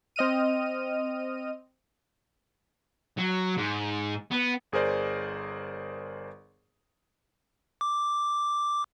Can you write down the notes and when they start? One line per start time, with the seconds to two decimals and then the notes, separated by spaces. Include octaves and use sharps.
0.16 C4 D#5 F6 D#7
3.17 F#3
3.57 G#2
4.31 B3
4.72 G1 G#4 A#4 C5 D5
7.81 D6